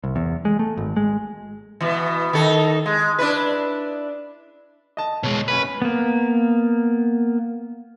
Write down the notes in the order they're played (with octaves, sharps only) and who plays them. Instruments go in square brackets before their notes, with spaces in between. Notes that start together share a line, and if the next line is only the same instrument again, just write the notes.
[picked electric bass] C2
E2
G#3
A3
G#1
G#3
[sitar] B2 E3
D#3 D#4 A4
G#3
D4 E4 B4
[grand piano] D#5 A5
[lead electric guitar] B2 G#3 [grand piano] C#5
[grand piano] F#1 C#4 B6 [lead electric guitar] B4
[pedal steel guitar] A#3 B3